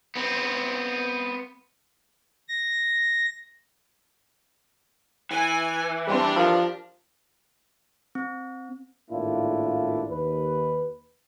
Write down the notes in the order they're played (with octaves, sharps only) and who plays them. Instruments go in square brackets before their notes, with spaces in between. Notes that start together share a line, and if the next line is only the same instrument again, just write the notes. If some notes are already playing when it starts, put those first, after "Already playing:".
[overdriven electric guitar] B3 C4
[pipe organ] A#6
[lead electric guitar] E3 [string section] G#5
[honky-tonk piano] G3 C4 [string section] D4 G4
[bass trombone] F3 [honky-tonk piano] A#4 A5
[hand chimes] C4
[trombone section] G#1 A2 A#3 D4 E4 F4
D#2 B4